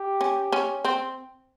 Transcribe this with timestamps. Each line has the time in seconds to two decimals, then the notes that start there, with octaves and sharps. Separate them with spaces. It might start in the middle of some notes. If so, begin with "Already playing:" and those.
Already playing: G4
0.21 C#4
0.52 C#4
0.85 C4